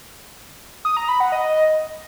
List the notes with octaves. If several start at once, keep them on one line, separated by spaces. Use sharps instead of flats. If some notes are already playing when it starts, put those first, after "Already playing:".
D#6
A#5
B5
F#5
D#5